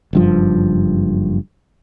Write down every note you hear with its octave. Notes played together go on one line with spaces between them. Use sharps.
F#1 G2 F3